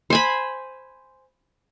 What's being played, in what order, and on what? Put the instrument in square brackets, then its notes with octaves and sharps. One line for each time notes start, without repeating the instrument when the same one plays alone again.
[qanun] C5 G#5 B5